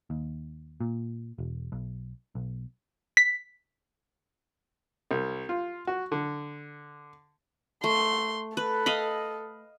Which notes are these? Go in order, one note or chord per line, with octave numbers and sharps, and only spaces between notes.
D#2
A#2
E1
B1
B1
B6
C2
F4
F#4
D3
A3 C6
A4 B4
D#5 F5 B5